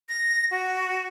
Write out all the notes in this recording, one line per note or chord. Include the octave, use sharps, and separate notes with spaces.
A#6
F#4